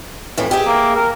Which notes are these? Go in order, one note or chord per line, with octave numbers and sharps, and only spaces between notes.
F2 A2 E3
G4 G#4 E5
A#3
A#4